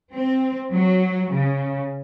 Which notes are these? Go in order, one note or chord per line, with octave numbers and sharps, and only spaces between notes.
C4
F#3
C#3